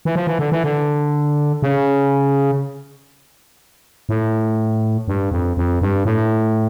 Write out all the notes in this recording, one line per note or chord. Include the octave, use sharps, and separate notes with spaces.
E3
F3
E3
D3
E3
D3
C#3
A2
G2
F2
F2
G2
A2